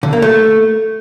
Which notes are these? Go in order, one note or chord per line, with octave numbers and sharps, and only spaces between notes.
D3
A#3
A3